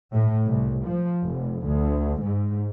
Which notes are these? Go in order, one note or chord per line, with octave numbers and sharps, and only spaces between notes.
A2
C2
F3
F1
D2
G#2